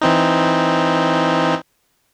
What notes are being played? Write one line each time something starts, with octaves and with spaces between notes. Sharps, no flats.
E3 C4 D#4